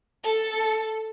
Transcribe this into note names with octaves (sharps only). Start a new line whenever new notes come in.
A4